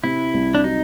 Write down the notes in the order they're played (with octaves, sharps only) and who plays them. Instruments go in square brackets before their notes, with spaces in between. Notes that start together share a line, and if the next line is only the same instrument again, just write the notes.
[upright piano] C3 [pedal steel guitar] E4
[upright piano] C2
[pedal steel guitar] D4
[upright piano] F#3 [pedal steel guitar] D#4